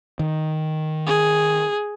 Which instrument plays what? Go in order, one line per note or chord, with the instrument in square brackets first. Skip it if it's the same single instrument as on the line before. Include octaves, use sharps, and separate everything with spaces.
[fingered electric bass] D#3
[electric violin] G#4